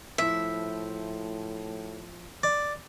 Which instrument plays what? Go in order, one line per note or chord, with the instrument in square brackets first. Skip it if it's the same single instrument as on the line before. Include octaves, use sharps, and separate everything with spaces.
[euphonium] A2 [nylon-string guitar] F3 E4 [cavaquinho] E5
[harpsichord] D5